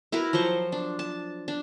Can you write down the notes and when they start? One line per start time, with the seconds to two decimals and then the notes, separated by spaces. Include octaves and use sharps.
0.12 E4 F#4 A#4 B4
0.33 F3 F#3 C5 C#6
0.72 D4
0.99 A5
1.48 D4